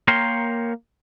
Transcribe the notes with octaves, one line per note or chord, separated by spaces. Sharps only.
A#3 A#4 C#5 G5 C6